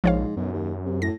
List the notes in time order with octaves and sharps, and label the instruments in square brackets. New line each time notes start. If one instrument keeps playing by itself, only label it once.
[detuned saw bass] A#1 [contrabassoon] G#2 [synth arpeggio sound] F3 C#5 F5
[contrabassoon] B1 [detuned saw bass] F#2
[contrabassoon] D#2
C3
[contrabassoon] A2 [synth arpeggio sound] A#6